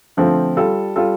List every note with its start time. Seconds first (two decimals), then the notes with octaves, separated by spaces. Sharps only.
0.17 D3 F3 A3 C4 F4
0.57 G3 F4 A4
0.96 G3 F4 A4